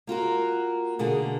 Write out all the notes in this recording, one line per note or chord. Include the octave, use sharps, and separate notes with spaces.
A#3 F4 F#4 A#4
B2 D3 A#3 G#4